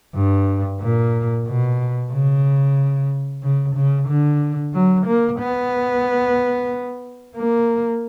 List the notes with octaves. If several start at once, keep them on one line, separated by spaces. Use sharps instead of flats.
G2
A#2
B2
C#3
C#3
C#3
D3
F#3
A#3
B3
A#3